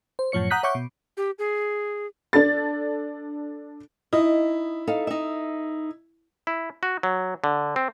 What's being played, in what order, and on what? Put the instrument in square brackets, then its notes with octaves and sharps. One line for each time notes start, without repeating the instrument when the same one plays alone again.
[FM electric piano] C5
F#2 A2 F3 C#5 C#7
F#5 A#5 D#6 F#6 G6 B6
C#5 E5 F#5 C#6 D6 G6
B2
[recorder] G4
G#4
[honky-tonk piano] D4 A4 A6
[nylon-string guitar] D#4 D#5 [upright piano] E4
[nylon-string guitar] D#4 A4 F5
D#4 E5
[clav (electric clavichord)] E4
F#4
F#3
D3
C4